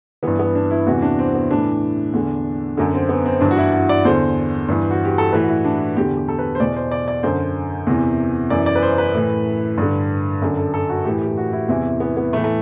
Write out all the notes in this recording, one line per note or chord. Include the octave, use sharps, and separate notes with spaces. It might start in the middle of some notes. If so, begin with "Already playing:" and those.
G2 E3 B3
B3
D4
E4
E2 C3 E3 F#4
D4
C4
B3
A2 E3 D4
E2 D3
F#2 D3
C4
B3
C4
G2 E3 D4
F#4
E4
F#4
D5
E2 D3 C5
G2 E3
F#4
G4
A4
A2 E3 B4
F#4
E4
D4
E2 D3 G4
G4
A4
B4
C5
E2 B2 D5
C5
D5
D5
F#2 D3 C5
E2 C3 E3
F#2 E3 D5
D5
B4
C5
B4
A2 E3
G2 D3
F#2 D3
A4
A4
F#4
A2 E3 G4
G4
F#4
E4
E2 C3 E3 E4
B3
B3
A2 E3 A3
A3